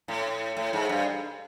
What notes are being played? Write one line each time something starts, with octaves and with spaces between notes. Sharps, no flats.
A2
A2
G#2
G2